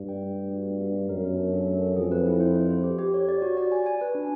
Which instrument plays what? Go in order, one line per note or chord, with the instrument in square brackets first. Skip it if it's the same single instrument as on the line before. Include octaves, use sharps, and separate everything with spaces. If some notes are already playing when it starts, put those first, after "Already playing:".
Already playing: [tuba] G2
[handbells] G5
A3
A3
F#4
B3
B3
B3
[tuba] F#2 [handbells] A#4
[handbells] A#4
D4
A4
A3
A4
[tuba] F2 [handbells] G#4
[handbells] B4
E4
C5
C5
C5
G4
G4
C#5
D5
F#4
D5
G#5
G#5
B4
D4